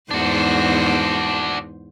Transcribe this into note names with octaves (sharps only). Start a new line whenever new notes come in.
E2 G#2 D4 F#4 C5